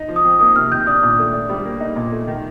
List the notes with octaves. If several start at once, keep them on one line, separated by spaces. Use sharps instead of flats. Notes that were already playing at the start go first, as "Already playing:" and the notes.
Already playing: D#4
F3
D#6
C4
A#3 D#6
C3 F6
D#3 G6
D4 D#6
A#2
A3
D4
G3
A#3
D#4
A#2
A3
D#3